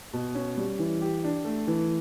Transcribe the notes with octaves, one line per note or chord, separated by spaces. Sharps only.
B2
C#4
G3
E3
G4
D4
A3
E3